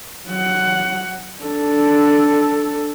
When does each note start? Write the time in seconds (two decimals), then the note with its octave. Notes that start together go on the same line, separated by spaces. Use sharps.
0.27 F#3 F#5
1.43 D4 A4